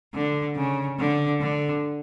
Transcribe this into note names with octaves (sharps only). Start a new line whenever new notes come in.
D3
C#3
D3
D3